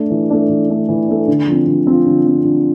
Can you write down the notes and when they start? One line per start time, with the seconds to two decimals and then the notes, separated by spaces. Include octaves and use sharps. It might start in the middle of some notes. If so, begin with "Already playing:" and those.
Already playing: A3 D4
0.10 E3
0.30 A3 D4
0.49 E3
0.70 A3 D4
0.89 E3
1.08 A3 D4
1.28 D3
1.47 F3 C4
1.67 D3
1.87 F3 C4
2.06 D3
2.25 F3 C4
2.45 D3